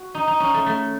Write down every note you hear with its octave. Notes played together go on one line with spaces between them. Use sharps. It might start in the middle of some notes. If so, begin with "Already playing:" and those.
Already playing: F#4
D#4
D#4
C#4
A3
A3